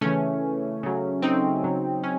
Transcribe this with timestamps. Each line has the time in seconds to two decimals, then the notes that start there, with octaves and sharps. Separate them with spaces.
0.01 C#3 E3 A3 C#4
0.83 C#3 F#3
1.22 C4 D#4
1.64 C#3 F#3
2.04 C#4